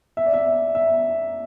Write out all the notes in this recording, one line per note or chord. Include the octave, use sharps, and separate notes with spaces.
E5
D5
E5
E5